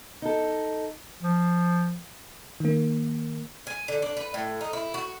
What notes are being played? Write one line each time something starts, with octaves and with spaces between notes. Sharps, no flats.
D#4 A4
F3
D#3 A#3
G#5
D3
D4
B4
A2
D#4
E4
F#4